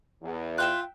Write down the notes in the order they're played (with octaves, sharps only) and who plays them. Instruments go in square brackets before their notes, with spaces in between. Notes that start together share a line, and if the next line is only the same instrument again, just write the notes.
[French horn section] E2
[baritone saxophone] F4 [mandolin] E5 G5 F#6